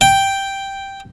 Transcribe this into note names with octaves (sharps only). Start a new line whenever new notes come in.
G5